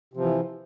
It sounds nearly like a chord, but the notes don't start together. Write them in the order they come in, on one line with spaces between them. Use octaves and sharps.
C3 F3 E3